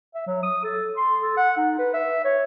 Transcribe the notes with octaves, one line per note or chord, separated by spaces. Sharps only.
E5
F#3
D#6
A4
C6
A4
F#5
D#4
B4
E5
C#5